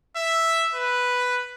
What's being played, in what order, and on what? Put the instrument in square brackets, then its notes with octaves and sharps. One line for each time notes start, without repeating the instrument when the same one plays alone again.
[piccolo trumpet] E5
B4